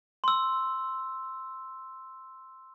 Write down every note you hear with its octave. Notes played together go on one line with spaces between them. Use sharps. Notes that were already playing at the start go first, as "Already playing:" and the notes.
C6 E6